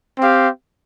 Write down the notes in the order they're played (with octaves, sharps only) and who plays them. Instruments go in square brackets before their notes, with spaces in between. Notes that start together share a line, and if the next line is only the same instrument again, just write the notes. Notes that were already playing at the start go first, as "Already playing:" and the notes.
[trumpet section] C4 G4 F5